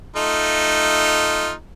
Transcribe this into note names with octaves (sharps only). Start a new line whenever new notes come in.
A3 D#4 F4